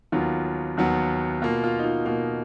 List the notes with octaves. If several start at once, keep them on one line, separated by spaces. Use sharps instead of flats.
D#2 D#3 F#3 B3 F4
D#2 D#3 F#3 B3
B2 A#3 F4
F4
D#4
F4
B2 A#3